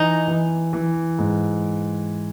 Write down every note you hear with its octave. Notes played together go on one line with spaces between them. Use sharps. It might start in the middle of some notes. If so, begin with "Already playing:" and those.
Already playing: E3 D#4
E3
E3
G#2